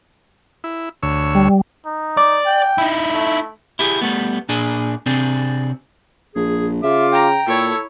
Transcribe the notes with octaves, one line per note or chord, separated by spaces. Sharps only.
E4
D2 C#5 E6
G3
D#4
D5 D6
G5
D#4 E4
A3
E4 G4 G#4
G3 A3 B3
A#2 D4 G#4
C3 C4 D4 G#4
A#1 G#4
C#3 F4 E5 D6
G5 A#5
A#2 E4 A4 C#5